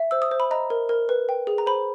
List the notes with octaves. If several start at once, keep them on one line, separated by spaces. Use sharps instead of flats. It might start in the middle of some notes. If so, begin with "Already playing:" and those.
Already playing: E5
C5 E6
D#6
C5
B5
D#5 A#5
A#4
A#4
B4
G5
G#4
A#5
C5 B5